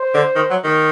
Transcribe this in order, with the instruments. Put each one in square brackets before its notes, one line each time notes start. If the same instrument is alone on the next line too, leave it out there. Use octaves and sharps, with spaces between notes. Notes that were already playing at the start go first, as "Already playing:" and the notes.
Already playing: [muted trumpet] C5
[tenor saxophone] D3
D#3
F#3
D#3